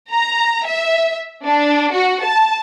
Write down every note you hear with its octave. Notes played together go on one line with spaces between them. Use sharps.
A#5
E5
D4
F#4
A5